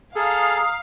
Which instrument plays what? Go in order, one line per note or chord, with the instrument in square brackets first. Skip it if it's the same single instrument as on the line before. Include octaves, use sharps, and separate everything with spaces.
[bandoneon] G#4 A4 [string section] F5 [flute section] A#5 D#6 F6